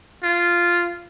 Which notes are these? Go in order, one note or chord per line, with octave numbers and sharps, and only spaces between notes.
F4